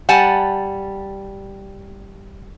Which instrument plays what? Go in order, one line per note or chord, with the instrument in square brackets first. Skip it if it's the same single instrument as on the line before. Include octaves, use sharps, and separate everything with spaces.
[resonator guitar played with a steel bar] G3 F#5 G#5 A5